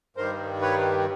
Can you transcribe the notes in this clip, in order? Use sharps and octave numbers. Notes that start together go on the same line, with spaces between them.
G2 D#3 G3 A#4 C5
B4 C#5